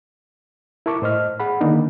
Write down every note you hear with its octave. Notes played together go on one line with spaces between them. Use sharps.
E4 A#4 A5 C#6 D6
A2 C5 D#5 F6
G#4 F#5 B5
D3 D#3 A#3 D4 D#4